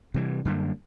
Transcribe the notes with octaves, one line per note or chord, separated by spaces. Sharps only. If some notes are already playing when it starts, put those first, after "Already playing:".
C3 E3 G3
F#2 D3 G3 A#3